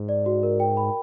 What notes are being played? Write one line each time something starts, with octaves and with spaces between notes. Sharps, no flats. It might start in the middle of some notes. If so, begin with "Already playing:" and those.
Already playing: G#2
D5
F#4
A#4
G5
B5